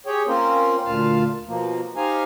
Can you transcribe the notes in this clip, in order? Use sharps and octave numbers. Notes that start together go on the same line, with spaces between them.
G4 G#4 C#5 G5
A#3 C4 C#4 F4 A#4 C5
D2 A#2 F4 F5 A5
B2 F3 A#3
D#4 G4 C5 F5 G#5 A#5